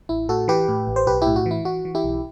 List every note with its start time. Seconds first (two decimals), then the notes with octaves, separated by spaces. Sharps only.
0.09 A1 E4
0.29 A2 F#4 A4
0.48 E3 G4 B4
0.68 A2
0.87 A1
0.96 C5
1.07 B1 G4 B4
1.22 A2 E4 G4
1.36 F#4
1.46 E3
1.51 E4
1.65 E3 F#4
1.85 E3
1.95 E4 G4
2.04 B1